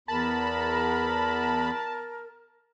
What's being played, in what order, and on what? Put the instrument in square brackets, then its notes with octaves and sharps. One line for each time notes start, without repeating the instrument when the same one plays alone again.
[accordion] E2 B5 [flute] A#4 [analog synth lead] A5